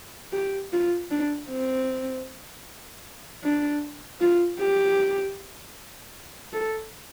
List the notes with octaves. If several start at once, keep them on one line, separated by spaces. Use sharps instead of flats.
G4
F4
D4
C4
D4
F4
G4
A4